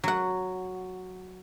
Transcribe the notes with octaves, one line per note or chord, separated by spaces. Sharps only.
F#3 F#5